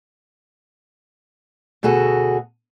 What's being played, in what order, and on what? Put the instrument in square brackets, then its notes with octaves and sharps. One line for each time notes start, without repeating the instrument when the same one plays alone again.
[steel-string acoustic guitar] D2 B2 F#4 G#4 A4